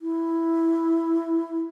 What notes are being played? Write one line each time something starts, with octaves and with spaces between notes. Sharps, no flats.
E4